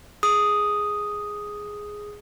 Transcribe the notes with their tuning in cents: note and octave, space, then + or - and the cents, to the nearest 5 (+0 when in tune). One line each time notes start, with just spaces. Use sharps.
G#4 +0 D#6 +0